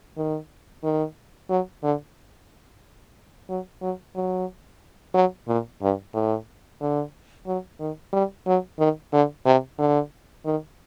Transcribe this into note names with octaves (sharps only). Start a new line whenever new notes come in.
D#3
D#3
F#3
D3
F#3
F#3
F#3
F#3
A#2
G2
A2
D3
F#3
D#3
G3
F#3
D#3
D3
C3
D3
D#3